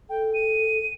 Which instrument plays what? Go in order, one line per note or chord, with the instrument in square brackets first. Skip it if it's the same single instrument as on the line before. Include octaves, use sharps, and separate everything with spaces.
[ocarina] A4 [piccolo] G5
[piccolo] D#7